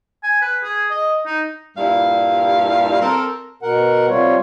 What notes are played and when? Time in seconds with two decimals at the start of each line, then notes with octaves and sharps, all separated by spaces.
0.23 G#5
0.42 B4
0.63 G#4
0.90 D#5
1.26 D#4
1.76 G2 A#2 G3 E4 F5
3.01 C4 A4 A#4
3.63 B2 A#4 F#5
4.09 C3 G3 F4 C#5